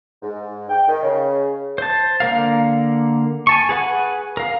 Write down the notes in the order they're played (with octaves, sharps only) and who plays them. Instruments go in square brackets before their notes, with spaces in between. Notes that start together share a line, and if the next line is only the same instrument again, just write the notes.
[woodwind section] G#2
G5
D#3
C#3
[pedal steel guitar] C5 A5
D3 A#3 A#4 F5
G#5 A5 C#6
G#4 B4 F#5 G#5
A#4 F5